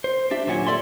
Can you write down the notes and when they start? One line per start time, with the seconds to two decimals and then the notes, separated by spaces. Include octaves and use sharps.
0.04 C5
0.31 G3 D4 G4 E5
0.47 D#2 A#2 F#3 C#4 F#5 G#5
0.67 A#2 A4 D5 E5 C6